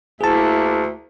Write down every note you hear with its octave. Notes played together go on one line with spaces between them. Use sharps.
D2 A#3 E4 G#4 A5